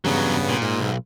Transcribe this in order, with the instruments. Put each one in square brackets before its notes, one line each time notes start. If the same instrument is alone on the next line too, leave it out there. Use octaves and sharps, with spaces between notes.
[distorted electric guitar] E2 F#3 [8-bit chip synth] G2 C#3 B3
[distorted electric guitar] A#2
[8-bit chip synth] G#2
[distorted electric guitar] B1